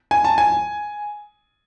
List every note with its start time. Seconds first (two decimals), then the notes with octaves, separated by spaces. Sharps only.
0.11 G#5
0.24 A5
0.38 G#5